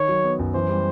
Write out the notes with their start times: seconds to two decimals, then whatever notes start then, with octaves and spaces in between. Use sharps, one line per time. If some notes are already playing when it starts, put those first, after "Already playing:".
Already playing: D#3 C#5
0.08 F#3
0.24 B3
0.39 F#2
0.54 E3 C5
0.69 G3